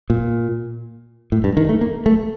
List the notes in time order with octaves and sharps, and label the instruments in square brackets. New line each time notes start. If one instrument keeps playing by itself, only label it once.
[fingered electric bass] A#2
A2
G2
D#3
A3
A#3
A3